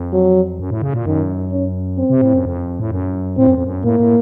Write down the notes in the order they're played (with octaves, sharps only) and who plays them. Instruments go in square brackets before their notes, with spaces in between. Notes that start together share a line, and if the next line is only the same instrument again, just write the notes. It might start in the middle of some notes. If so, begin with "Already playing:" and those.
Already playing: [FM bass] F2
[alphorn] F#3
[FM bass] F#2
A2
C#3
A#2
[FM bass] F#2 [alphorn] D#3
[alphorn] C#4
C4
[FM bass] C3
A2
F#2
F2
A2
F#2
[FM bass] A2 [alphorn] C4
[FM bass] F#2
F2
F#2
[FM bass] A2 [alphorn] A#3
[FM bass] A2